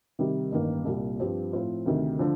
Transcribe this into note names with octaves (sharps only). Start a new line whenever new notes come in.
C3 D#3 G3
A1 G2 D#3 A#3
C2 A#2 G3
G2 F3 C4 G4
A2 F3 C4 F4 C5
D2 C3 D#3
D3 F3